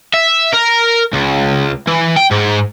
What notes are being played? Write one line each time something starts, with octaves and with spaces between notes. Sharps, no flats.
E5
A#4
C#2
E3
G5
G#2